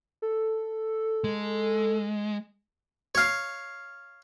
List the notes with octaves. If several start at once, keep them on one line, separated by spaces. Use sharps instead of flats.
A4
G#3
C#5 F5